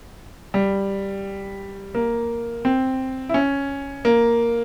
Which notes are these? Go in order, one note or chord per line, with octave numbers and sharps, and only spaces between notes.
G3
A#3
C4
E4
C#4
A#3